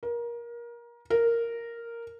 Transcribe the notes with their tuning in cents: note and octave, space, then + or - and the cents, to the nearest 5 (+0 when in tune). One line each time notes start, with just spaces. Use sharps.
A#4 +25
A#4 -5